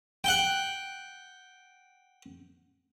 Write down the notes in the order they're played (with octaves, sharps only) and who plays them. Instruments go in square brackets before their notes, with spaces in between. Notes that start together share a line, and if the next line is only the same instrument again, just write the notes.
[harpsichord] F#5 G5